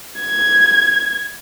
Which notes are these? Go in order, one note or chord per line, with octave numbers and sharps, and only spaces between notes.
G#6